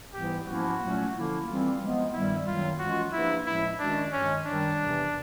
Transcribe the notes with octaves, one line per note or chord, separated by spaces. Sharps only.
G#2 E3 G3 B3 E4 G4
G#2 F3 A#3 C#4 E4 F#4
A#2 F#3 A3 C#4
D3 F3 A#3 C#4 E4
E3 G3 C4 F4
F3 G#3 B3
G2 D#3 G3 E4
F#2 D#3 F#3 A#3 F4
E3 G#3 C#4 F4 F#4
F3 A#3 D4 E4 G4 B4
A2 F3 G#3 C#4 E4
D#3 G#3 C#4 D4 F#4
G2 D#3 G#3 C#4
F#2 D#3 G3 D4
E2 C3 E3